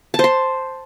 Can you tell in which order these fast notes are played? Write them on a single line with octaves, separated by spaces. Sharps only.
A5 C5 C6